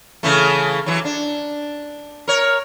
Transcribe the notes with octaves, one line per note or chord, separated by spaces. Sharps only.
C#3 E3 A3
E3 F#3
D4
A#4 C#5